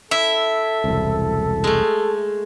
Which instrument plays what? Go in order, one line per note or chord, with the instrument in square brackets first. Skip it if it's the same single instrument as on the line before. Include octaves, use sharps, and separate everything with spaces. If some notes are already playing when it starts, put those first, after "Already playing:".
[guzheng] E4 [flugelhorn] A4 [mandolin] E5
[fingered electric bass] E1 C2
[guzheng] G#3 A3